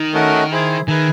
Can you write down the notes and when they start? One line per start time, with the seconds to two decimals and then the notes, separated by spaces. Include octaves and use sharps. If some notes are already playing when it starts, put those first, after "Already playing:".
Already playing: D#3
0.14 A3 C#4 F#4 A#4 D#5
0.51 E4 G#4 C5
0.88 D#3 G#4 B4 E5 G#5